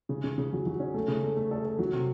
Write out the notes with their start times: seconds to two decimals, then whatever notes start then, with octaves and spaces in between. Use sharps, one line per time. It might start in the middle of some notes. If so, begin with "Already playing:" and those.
0.09 C#3
0.24 C#3
0.38 C#3
0.53 F#3
0.66 F#3
0.80 C#4
0.94 A3
1.08 C#3
1.23 A3
1.37 A3
1.51 A4
1.65 A4
1.79 F#3
1.93 C3